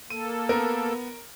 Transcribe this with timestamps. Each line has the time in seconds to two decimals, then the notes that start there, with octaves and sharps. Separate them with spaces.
0.10 A#3 A4 D#7
0.49 B3 A#4